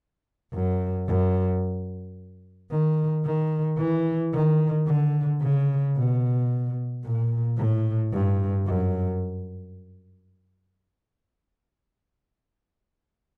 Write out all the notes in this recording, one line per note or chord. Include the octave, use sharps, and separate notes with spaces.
F#2
F#2
D#3
D#3
E3
D#3
D3
C#3
B2
A#2
A2
G2
F#2